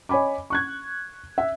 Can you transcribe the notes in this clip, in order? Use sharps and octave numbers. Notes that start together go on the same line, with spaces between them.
C#5 D#5 G#5 B5 D6
C#6 F#6 G#6
E5